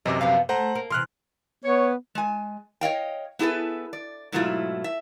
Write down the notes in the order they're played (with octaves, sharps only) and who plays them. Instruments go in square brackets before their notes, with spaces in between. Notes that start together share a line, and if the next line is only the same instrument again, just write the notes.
[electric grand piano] F#2 C3 D6 [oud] E3 D#5
[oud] F3 B3 F5
[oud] A3 [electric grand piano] C5 F#5 A#5
[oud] A#3
[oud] C3 E3 [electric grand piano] C6 F6 F#6
[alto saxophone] B3 [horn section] C#5
[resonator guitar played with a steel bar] G#3 G#5
C#5 D#5 F5 G5
B3 E4 G#4 A4 B4
D5
G#2 B2 F#3 A3 E4 F4
E5